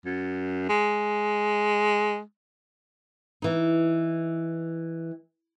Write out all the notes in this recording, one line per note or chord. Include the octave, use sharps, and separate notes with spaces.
F#2
G#3
E3 D#4